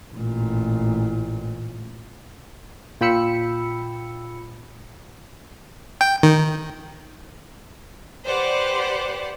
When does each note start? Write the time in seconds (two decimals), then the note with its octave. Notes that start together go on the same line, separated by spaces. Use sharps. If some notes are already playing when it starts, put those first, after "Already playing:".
0.13 A1 A#2
3.01 A#2 F4 G5 B5 E6 C#7
6.01 G5
6.23 D#3
8.26 G4 B4 C5 D5 F#5